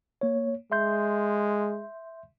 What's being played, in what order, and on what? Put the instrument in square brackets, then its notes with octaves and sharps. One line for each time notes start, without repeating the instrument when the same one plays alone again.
[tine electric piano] A#3 C#5
[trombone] G#3 [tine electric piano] E5 C6 G6